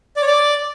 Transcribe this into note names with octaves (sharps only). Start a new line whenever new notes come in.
D5
C#5
D5